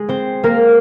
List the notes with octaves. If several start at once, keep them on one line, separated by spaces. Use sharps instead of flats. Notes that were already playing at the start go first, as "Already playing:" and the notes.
Already playing: G#3 G#4
C4 C5
A#3 A#4